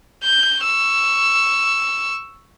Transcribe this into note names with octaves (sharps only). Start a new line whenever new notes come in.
G6
C#6 E6